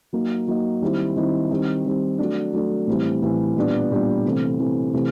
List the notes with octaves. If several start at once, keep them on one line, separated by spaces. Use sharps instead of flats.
F#3 A#3 D#4
F#3 A#3 D#4
D#3 G3 C4 E4
D#3 G3 C4 E4
D#3 G3 C4
D#3 G3 C4
F#3 A3 D4
F#3 A3 D4
A2 E3 G3 C4 E4
A2 E3 G3 C4 E4
A#2 G3 B3 D4
A#2 G3 B3 D4
C3 E3 A3 C4
C3 E3 A3 C4
C3 E3 A3